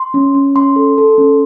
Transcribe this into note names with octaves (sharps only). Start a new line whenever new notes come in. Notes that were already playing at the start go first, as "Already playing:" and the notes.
Already playing: C6
C#4
C#4
C#4 C6
A4
A4
C#4